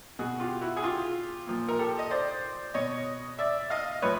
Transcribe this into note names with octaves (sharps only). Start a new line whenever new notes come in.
B2 F#4 G#4
F4 G4
E4 F#4
G#4
F4 G4
A#2 F3
A#4
G4 A4
D#5
C5 D5
B2 C#5 D#5
D5 E5
D#5 F5
A2 F3 B4 C#5